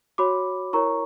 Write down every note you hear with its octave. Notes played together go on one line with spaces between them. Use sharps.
F#4 C#5 B5 D6
E4 A#4 C#5 A#5 C#6